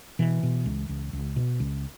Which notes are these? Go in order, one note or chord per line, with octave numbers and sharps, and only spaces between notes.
B2 E3
B2
C#2
C#2
C#2
B2
C#2